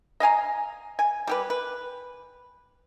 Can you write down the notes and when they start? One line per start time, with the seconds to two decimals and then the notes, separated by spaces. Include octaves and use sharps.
0.20 D#5 F5 G#5 A#5
0.99 G#5
1.27 G3 G4 B4
1.50 B4